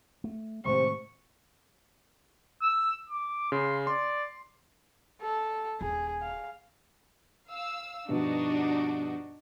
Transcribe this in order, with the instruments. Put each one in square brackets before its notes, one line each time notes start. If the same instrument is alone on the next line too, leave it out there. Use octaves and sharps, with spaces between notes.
[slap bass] A3
[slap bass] A2 D#3 G#3 [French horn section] C3 C5 [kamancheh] C#6
[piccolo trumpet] E6
D6
[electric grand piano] C#3 [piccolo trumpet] C6
[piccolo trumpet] D5 [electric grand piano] C6
[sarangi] A4
[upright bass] D#1 [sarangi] G#4
[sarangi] F5
[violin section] F5 E6
[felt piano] G2 B2 F3 [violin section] D4 D#4 F#4